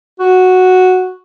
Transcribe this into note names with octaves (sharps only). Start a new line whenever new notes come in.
F#4